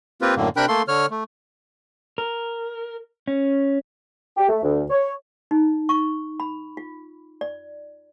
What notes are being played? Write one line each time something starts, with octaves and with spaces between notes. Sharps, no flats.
A#3 C4 F4 G4 B4
F#2 A2 D3 A#3
C3 D4 A#4 G5 B5 F#6
A3 A#3 A4 C6
D3 C#5 F6
A3
A#4
C#4
G4
A3
D2
C#5
D#4
C#6
B5
F4
D5